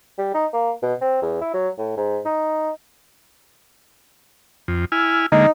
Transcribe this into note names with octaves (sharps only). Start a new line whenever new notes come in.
G3
D#4
A#3
B2
C4
E2
E4
F#3
A2
G#2
D#4
F2
E4 G#5 F6
D3 G#3 A#3 D#4